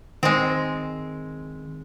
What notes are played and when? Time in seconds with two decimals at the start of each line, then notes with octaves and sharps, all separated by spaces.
0.23 D#3 G#3 C4